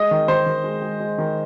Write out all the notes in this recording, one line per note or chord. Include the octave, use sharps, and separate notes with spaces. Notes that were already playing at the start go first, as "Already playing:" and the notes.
Already playing: G#3 D#5
D#3
D#3 C5
D#3
G#3
G#3
G#3
D#3